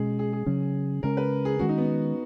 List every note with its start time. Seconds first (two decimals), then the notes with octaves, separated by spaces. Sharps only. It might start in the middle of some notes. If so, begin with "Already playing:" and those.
Already playing: B2 G#3 C#4 G#4
0.19 G#4
0.33 G#4
0.46 C#3 F#3 C#4
1.03 C#3 G#3 C#4 A#4
1.17 B4
1.45 G#4
1.59 D#3 G#3 C#4 F#4
1.69 D#4
1.78 B3